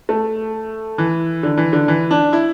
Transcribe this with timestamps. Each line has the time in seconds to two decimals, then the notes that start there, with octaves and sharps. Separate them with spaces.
0.09 A3
0.98 E3
1.43 D3
1.57 E3
1.73 D3
1.88 E3
2.11 D4
2.33 E4